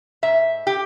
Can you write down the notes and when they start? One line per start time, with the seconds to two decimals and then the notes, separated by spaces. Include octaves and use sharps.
0.23 G#2 E5
0.67 G4